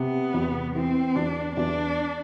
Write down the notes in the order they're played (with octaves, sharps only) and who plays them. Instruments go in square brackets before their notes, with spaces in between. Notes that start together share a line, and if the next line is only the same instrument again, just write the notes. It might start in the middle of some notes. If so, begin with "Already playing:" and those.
Already playing: [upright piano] C3 [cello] B3
[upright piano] E2
[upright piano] E3 [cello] C4
[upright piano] E2 [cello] D4
[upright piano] E2 [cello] D4